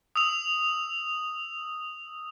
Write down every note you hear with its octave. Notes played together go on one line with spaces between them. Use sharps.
D#6 E6 F7